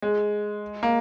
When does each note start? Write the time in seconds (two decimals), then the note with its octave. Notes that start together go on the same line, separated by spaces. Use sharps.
0.02 G#3
0.83 A#3